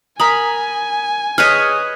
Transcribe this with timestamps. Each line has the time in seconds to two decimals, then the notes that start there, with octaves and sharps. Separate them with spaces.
0.20 A#4 G#5 A#5 B5 D#6
1.38 G#4 B4 C#5 D#5 D#6 F6